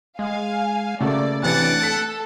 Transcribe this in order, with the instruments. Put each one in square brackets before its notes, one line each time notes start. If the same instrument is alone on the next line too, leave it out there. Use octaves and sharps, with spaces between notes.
[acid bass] G#3 [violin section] F5 G#5
[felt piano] C#3 F#4 A4 [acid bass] A3 [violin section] A#3 D5
[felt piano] A1 C3 E3 [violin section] D4 A6 D7 [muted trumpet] F#5
[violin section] A4 [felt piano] B6